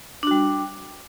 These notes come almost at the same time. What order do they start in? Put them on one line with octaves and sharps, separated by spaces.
D4 F#4 G3